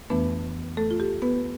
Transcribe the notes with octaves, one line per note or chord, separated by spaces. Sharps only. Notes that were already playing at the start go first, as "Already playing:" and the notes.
F2 E3 A3 B3 D4 B4
A3 A4
F4
G4
B3 B4